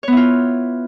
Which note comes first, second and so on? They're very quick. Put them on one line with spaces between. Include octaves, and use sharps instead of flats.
C#5 B3 E4 F4